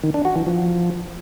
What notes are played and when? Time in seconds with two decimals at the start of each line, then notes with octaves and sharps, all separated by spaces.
0.04 D#3
0.14 D4
0.25 F#4
0.36 E3
0.46 F3